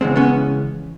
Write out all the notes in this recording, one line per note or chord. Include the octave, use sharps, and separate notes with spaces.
C#3 E3 G#3 B3 C4
B3 C#4